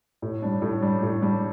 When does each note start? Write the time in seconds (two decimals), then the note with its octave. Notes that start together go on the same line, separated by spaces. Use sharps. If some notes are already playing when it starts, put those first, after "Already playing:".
0.22 A2
0.42 G3 D4
0.62 A2
0.82 G3 D4
1.03 A2
1.22 G3 D4